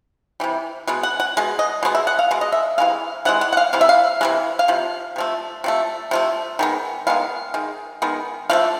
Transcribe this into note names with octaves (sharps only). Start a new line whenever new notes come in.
C3 E3 G3
B2 G#3 B3
F#5
F#5
B2 G#3
D#5
B2 G#3 B3
E5
F#5
F5
B2 G#3
D#5
E5
C3 E3 G#3 F5
C3 E3 G#3 F#5
F#5
F#5
F5
C3 E3 F5
E5
F5
C3 E3 G#3
F5
C3 F3
C3 F3 A3
C3 F3 A3
C3 F3 A3
D#3 G#3 B3
D#3 G#3 B3 F5
D#3 G#3
D#3 G#3 B3
D3 F3 A3 F5